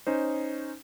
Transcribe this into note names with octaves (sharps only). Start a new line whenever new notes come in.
C#4 D#4 C5